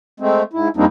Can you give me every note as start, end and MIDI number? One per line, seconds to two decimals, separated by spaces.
0.20 0.43 56
0.20 0.43 57
0.20 0.43 60
0.53 0.68 44
0.53 0.68 64
0.77 0.85 41
0.77 0.85 55
0.77 0.85 58
0.77 0.85 60
0.77 0.85 62
0.77 0.85 63